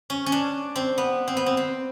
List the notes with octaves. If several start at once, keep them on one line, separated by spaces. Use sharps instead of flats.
C#4
C#4
D4
C4
B3
C4
B3
C4
C4